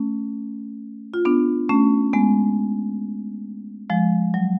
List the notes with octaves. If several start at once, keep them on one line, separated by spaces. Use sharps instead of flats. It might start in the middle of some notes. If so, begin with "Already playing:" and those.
Already playing: A3 C#4
F4
B3 D4
A3 C#4
G#3 B3
F3 G#3
F#3